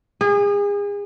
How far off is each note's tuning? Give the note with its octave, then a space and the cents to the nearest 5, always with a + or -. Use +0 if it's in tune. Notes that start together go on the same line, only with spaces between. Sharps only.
G#4 -35